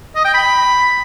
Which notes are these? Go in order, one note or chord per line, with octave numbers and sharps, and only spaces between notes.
D#5
G5
B5